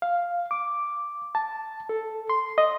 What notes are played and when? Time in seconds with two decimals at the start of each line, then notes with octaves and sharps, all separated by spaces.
0.02 F5
0.51 D6
1.35 A5
1.89 A4
2.30 C6
2.58 D#5